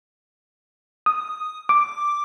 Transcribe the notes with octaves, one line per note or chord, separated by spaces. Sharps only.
D#6
D6